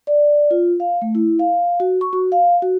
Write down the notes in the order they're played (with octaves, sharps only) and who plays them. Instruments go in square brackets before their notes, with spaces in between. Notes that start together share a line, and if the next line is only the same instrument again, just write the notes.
[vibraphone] D5
F4
F5
A3
E4
F5
F#4
C#6
F#4
F5
F#4